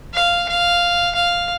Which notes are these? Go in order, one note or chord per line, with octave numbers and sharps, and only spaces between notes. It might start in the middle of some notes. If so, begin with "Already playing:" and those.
F5
F5
F5